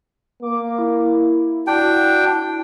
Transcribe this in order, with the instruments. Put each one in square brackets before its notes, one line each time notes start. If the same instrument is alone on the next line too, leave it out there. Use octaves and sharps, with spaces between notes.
[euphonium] A#3 [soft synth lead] D6
[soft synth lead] E4
[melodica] D4 G5 [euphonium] F#4